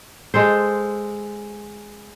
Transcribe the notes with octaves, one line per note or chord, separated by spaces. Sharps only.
G#3 A4 C5